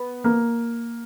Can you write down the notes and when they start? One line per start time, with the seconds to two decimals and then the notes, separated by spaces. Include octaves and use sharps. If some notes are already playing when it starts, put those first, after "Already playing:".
Already playing: B3
0.24 A#3